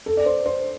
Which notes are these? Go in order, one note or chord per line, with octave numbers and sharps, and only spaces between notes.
A4
D5
C5
C5